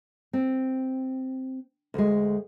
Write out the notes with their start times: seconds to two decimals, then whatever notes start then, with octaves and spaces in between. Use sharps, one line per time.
0.33 C4
1.94 D2 G#3